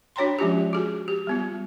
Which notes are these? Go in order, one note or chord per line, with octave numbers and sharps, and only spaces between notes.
D4 F#4 C#5 G5 A#5 C6
F3 G#3 C#4 F4 G4
F#4 G#4 G#5
G4
G3 B3 F4